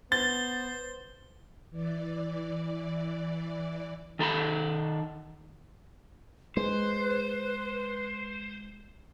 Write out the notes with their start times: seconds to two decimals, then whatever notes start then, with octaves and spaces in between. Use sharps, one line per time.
0.12 B3 C5 A6 G7
1.70 E3 D5
4.19 D#3 A4 A#5 B5
6.57 G#3 B4 C5